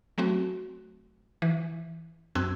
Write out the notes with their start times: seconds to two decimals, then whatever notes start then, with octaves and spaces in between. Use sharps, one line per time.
0.18 F#3 A3 C4 F#4
1.42 E3
2.35 F#2 C4 E6 F#6 G#6